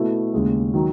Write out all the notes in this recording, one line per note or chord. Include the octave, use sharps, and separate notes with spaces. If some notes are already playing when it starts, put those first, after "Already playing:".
Already playing: B2 A3 E4
D#2 C#3 G#3
D#3 F#3